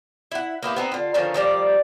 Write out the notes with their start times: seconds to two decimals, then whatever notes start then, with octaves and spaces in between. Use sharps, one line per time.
0.31 E4 F#5
0.63 A#3 B3 E4 G4
0.76 B3 C4 D#4
0.92 D3 F4
1.14 D3 D#3 F3 C#4
1.34 D#3 F3 G3 D5